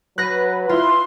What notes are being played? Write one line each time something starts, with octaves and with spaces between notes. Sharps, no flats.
F#3 B4 F#6 A#6
E4 F4 C6